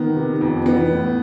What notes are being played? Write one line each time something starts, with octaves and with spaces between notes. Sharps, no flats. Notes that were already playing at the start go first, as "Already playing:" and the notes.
Already playing: D#3 B3
C3
F2
E3 B3
A2